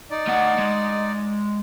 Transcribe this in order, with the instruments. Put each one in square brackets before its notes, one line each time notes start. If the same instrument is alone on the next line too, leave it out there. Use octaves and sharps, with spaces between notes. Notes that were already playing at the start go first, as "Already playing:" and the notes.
[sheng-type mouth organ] D#4 D5
[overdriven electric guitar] A3 F#5
G#3